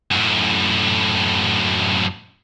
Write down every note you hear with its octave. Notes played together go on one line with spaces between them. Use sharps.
F#2 A2